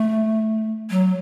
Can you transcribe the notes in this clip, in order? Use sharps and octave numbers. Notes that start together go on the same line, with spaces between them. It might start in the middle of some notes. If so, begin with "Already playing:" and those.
Already playing: A3
F#3